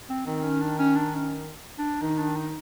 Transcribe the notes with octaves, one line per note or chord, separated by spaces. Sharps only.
C4
D#3 C4
C#4
D4
C#4
D4
C#4
D4
D#3 D#4
D4
D#4